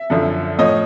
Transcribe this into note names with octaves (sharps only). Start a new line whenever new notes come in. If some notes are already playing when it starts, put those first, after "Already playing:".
Already playing: E5
F#2 D3 F3
A2 F3 C#5 D#5